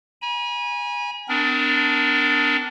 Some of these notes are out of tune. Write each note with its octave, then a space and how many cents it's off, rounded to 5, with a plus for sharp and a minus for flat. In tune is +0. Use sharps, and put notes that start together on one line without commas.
G#5 -15 B5 -45
B3 +45 D4 +0 A#4 +0